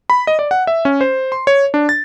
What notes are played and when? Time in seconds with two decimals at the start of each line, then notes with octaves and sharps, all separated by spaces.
0.10 B5
0.27 D#5
0.39 D5
0.51 F#5
0.67 E5
0.85 C#4
1.01 C5
1.32 C6
1.47 C#5
1.74 D4
1.89 A6